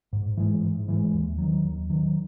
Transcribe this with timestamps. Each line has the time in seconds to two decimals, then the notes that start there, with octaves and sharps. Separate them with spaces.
0.13 G#2
0.37 E3 G#3
0.63 G#2
0.88 E3 G#3
1.13 D#2
1.38 D#3 F#3
1.64 D#2
1.90 D#3 F#3